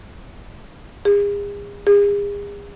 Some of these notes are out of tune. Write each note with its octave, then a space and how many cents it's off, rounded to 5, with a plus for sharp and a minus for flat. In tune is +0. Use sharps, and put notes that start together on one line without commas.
G#4 -40
G#4 -40